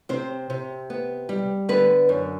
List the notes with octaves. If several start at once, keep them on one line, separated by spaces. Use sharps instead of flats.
C3 C4 C5
C3
B3
G3
D3 B3 B4
F#2